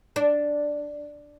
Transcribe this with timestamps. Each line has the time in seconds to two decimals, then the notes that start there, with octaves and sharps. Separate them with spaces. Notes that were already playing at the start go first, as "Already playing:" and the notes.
0.16 D4